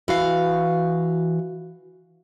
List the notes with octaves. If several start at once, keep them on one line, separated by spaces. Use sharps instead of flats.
E3 F#4 F5